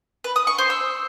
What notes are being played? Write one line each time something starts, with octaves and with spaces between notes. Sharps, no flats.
B4
D#6
C#6
C5
E6